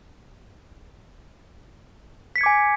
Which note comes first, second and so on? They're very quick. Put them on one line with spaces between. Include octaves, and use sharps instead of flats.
B6 C#7 G#6 D6 G#5